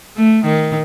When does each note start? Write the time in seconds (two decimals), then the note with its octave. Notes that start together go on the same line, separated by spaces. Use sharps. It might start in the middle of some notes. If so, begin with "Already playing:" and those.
0.17 A3
0.45 D#3